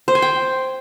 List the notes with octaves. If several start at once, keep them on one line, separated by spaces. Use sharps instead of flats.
C5
G#5
G5